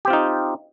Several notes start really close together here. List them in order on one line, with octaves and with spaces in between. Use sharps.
G4 C4 F4 D#4